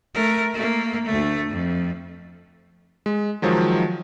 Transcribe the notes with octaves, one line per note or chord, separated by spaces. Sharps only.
A3 A#4
A3 A#3
D2 A3
F2
G#3
D#3 F3 F#3 G#3